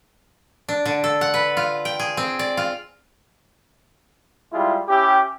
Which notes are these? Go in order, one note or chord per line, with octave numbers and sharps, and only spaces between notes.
D4
D3
A4
F#5
B4
F4
G5
G#4
C4
D5
F4
G3 G#3 E4 F4
C#4 E4 G4